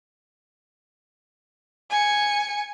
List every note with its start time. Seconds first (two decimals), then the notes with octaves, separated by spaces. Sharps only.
1.90 G#5 C#7